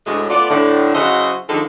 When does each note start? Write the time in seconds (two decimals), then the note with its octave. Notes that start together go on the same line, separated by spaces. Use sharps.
0.06 D2 A2 G#3
0.30 A3 B3 F4 D5
0.50 A2 D3
0.95 C#3 F#3 E4 F#4 C5 D#5
1.49 D3 D#3 F3 G#3 A4